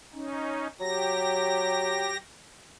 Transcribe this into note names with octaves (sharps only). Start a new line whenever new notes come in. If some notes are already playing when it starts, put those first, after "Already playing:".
C#4 D#4
F#3 G4 A#6